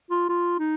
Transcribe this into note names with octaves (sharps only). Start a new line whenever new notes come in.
F4
F4
D#4